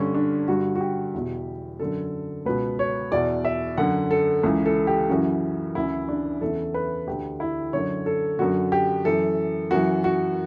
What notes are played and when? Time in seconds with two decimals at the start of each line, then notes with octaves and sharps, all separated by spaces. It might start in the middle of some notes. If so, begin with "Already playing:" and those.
Already playing: G2 D3 C#4
0.15 D4
0.48 G2 D3 F#4
0.76 F#4
0.81 G4
1.14 E2 B2
1.79 F#2 D3 A4
2.46 C#2 B2 B4
2.79 C#5
3.12 E2 B2 D5
3.45 E5
3.77 F#2 D3 F#5
4.11 A4
4.43 C#2 C#3 E3
4.66 A4
4.87 G4
5.09 F#2 C#3 E3 F#4
5.75 D2 C#3 E3 E4
6.08 D4
6.41 E2 C#3 E3 A4
6.74 B4
7.07 D2 D3 G4
7.40 E4
7.73 F#2 D3 C#5
8.06 A4
8.39 F#2 D3 F#4
8.72 G4
9.05 F#2 E3 A4
9.71 F#2 E3 F#4
10.04 F#4